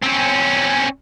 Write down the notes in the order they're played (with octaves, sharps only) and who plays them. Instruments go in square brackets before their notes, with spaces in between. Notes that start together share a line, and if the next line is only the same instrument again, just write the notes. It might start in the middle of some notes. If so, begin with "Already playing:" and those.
[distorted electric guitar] C4 C#4